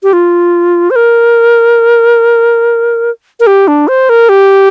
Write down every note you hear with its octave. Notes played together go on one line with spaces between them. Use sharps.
G4
F4
C5
A#4
A#4
G4
D4
C5
A#4
G4